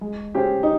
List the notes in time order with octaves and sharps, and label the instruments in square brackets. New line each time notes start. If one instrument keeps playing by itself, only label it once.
[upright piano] G#3
[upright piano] C#4 G#4 C5 [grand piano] G4
[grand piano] D#4